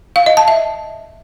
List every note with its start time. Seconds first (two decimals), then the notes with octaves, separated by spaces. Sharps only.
0.16 F5
0.26 D#5
0.37 A5
0.48 E5